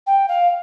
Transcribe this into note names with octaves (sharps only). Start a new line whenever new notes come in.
G5
F5